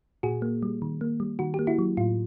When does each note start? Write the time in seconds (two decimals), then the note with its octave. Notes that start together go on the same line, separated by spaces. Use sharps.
0.23 A#2 F#4 G#4
0.42 A#3
0.63 G3
0.82 D#3
1.01 A#3
1.20 G3
1.39 D#3 F#4
1.54 A#3 G4
1.67 E4 F#4
1.79 F#3
1.97 A2 F4